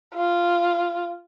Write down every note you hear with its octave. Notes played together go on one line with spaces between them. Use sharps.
F4